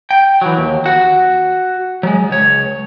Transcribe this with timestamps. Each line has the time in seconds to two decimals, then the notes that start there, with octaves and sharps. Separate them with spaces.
0.11 G5
0.42 E3 F#3
0.57 D#2
0.86 F#4 F#5
2.03 F#3 G#3
2.30 C#2 C#5